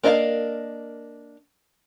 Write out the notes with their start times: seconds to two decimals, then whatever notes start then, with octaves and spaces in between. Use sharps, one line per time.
0.04 A#3 D4 A#4 D#5 F5